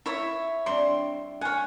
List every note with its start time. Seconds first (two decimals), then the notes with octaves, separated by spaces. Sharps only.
0.06 E4 C#5 E5
0.66 G3 C4 D4 C6
1.41 C#5 F#5 G#5 F6